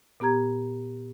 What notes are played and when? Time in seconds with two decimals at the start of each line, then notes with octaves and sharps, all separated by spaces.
0.20 A#2 B3 G4 A#5 G#6